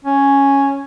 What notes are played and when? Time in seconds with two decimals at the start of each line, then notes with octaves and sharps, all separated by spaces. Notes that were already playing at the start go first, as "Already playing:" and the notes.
0.04 C#4